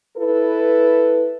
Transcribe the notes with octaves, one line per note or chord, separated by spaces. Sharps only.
E4 A4 B4